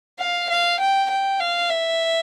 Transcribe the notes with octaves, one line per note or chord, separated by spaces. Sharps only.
F5
F5
G5
G5
F5
E5